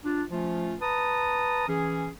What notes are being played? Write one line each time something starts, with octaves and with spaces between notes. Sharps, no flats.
D4 F4
F3 A3 C#4 F4
B4 A5 A#5 D#6
E3 C#4 G#4